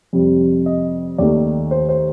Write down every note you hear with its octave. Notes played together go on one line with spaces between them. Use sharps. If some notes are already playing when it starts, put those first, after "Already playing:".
F2 C3 G3
D#5
D#2 D#3 A3 D5
C5
C5